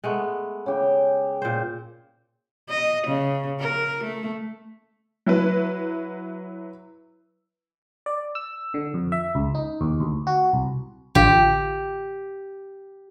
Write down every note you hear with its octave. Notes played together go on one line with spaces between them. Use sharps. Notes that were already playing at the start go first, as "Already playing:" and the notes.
G#3 A3 B3
C#3 G4 G5
A#2 C5
D#5
C#3
A#4
A3
F#3 E4 B4
D5
E6
D3
F2
E5
C#2
D#4
D#2
D2
F#4
C2
A1 D3 F4 G4